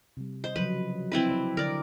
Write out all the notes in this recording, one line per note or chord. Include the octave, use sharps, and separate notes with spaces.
C3 G3
C5 D#5
C#3 F3 F#3 B4
C4 E4 B4
D5
D3 A#4 D5